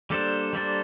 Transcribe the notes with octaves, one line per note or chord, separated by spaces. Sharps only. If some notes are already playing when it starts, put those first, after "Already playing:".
G3 A#3 D4 A4 C5
G3 A#3 D4 A4 C5